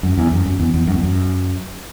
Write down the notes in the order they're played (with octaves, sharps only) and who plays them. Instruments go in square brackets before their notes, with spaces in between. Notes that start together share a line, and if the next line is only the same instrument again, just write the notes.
[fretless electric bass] F#2
E2
F#2
F#2
E2
E2
F#2
E2
F#2